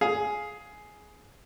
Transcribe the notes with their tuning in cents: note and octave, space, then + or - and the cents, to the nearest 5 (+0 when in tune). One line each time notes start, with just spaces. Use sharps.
G#4 +10 F5 +5